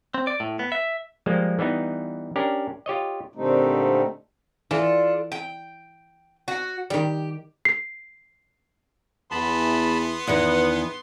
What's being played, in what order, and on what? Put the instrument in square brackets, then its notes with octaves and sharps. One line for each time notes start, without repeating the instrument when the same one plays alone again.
[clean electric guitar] C4
D5
A2
B3
E5
[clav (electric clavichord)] F3 G3 G#3 A#3
E3 G3 B3 D#4
C#4 D4 G4 A#4
F4 G4 C#5 D#5
[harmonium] A#2 D3 G3 A3 C4 D#4
[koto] E3 [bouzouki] D4 F4 A4
[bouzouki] G5
F#4
[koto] D#3 G3 [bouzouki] G4
[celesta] C7
[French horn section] E2 [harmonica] B3 C6 [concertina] A5 B5
[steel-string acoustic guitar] E2 D#3 E3 [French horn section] B4 [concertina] F#5